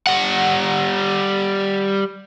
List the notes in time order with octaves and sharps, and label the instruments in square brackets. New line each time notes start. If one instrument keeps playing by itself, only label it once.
[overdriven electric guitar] G3 F#5